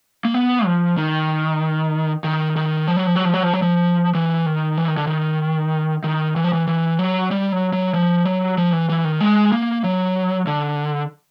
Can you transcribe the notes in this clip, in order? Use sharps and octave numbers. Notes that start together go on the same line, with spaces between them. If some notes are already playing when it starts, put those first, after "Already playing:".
A#3
B3
F3
D#3
D#3
D#3
F3
F#3
F3
F#3
F3
F#3
F3
F#3
F3
E3
D#3
E3
D#3
D3
D#3
D#3
E3
F3
E3
E3
F#3
G3
F#3
F#3
F3
F#3
F3
E3
E3
D#3
G#3
A#3
F#3
D3